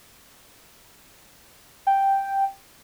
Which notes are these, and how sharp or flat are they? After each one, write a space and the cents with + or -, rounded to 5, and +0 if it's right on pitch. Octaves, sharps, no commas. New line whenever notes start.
G5 +0